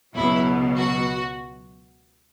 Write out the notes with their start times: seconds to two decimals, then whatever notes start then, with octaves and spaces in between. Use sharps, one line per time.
0.15 C#2 B2 F#3 E4
0.76 F#4